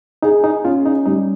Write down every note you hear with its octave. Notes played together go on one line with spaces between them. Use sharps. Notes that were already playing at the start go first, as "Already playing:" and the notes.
D#4 G#4
D#4
C#4 F4
D#4
G3 D#4